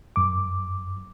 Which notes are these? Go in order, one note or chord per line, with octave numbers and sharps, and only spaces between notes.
F#2 D6